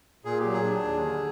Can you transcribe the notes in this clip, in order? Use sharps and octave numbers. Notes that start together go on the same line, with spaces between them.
A#2 G#4
G4
F#3
G#4
D4
D#2
D3